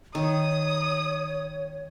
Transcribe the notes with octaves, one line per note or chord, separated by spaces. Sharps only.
D#3 C#5 D#6